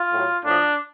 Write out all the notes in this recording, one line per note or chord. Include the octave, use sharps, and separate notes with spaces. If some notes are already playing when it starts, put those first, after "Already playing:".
Already playing: F4
A2 F#3
A2 F3 D4